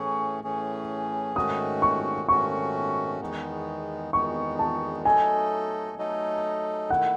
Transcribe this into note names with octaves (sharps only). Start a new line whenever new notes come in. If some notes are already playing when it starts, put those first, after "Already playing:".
Already playing: A2 E3 A3 C#4 G#4 C#6
A2 E3 A3 C#4 G#4
G#2 D#3 A3 C#4 F#4 D#6
C#6
G#2 D#3 A3 C#4 F#4 C#6
E2 D#3 G#3 B3 D#4
E2 D#3 G#3 B3 D#4 C#6
A5
F#3 A3 D#4 A4 D#5 G#5
F#3 A3 D#4 A4 D#5
D#3 A3 E4 F#5